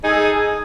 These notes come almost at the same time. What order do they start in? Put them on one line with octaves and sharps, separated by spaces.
D#4 G#4 A4